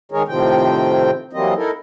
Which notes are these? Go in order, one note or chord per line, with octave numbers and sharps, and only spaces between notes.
D#3 G#3 G#4 A#4 C#5
A2 C3 D#3 F3 C4 G5
E3 F#3 G3 A#3 C4 D#5
D#4 E4 A4 A#4